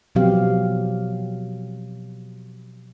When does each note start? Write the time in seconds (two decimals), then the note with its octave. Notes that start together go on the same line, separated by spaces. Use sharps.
0.15 B2 F3 F#3 C4 G4 F5